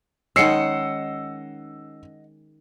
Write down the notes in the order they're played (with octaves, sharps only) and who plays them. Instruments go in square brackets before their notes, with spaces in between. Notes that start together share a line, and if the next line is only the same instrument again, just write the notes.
[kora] D#3 G#3 C#4 [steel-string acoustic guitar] D#5 F#5 [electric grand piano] E6 C7 C#7